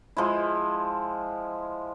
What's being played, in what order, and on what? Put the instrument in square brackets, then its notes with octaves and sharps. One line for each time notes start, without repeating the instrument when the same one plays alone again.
[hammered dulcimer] F3 G#3 E4